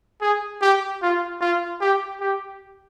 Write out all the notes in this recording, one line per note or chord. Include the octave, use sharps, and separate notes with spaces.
G#4
G4
F4
F4
G4
G4